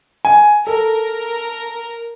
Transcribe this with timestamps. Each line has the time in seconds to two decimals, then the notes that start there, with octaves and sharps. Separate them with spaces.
0.25 G#5
0.67 A4 A#4